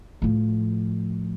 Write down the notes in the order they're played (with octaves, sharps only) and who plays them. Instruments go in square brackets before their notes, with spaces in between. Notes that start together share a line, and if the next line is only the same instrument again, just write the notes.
[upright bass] A2 F3